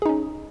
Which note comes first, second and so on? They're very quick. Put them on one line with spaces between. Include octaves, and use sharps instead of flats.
G#4 D#4 C#4